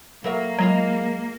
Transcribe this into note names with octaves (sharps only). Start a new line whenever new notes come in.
F#3 A#3 A#4 E5
F#3 G#3 F4 G#4